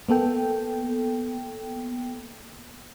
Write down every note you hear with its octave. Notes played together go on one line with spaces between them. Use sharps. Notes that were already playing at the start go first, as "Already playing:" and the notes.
A#3 B3 A4 G5